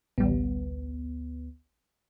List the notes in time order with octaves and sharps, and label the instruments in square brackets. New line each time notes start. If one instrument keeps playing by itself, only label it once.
[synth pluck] A1 G3 [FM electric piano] D2 B3